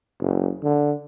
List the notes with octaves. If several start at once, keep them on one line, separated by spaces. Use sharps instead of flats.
F#1
D3